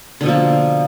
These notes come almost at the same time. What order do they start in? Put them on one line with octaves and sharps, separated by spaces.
D3 B2 F3 A#3